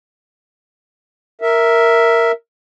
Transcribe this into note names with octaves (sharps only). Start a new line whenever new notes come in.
A#4 E5